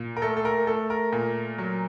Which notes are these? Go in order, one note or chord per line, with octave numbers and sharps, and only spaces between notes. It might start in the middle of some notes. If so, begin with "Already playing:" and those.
Already playing: A#2
A#4
A3 A4
A4
A#4
A3 A4
A#4
A#2
F#3